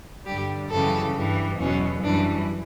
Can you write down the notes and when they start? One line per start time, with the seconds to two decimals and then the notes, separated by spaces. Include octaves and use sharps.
0.25 G2 D3 G3 G4
0.70 F#2 C#3 E3 G3 A4
1.14 G2 E3 G3
1.58 E2 B2 F#3 C#4
2.03 F#2 E3 G3 D4